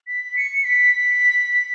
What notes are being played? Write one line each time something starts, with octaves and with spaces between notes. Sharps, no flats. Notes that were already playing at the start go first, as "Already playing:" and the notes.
B6
C#7
B6